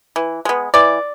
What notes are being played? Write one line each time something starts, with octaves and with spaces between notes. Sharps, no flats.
E3
G#3 B3
E3 D5